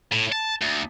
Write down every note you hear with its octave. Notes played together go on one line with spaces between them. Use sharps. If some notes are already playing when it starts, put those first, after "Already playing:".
A2
A5
D2